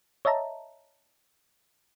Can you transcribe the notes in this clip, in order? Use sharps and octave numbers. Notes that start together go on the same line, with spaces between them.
C#5 D#5 E5 A5 A#5